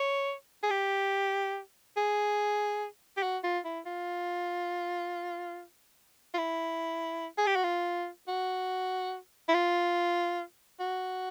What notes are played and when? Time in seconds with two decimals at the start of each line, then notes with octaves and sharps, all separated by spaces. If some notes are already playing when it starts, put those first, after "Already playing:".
Already playing: C#5
0.63 G#4
0.70 G4
1.97 G#4
3.17 G4
3.23 F#4
3.44 F4
3.65 E4
3.86 F4
6.34 F4
6.38 E4
7.38 G#4
7.47 G4
7.56 F#4
7.64 F4
8.28 F#4
9.49 E4
9.54 F4
10.80 F#4